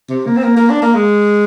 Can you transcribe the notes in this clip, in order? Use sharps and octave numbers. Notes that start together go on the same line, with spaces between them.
C3
A#3
C4
A#3
A#3
D4
A#3
G#3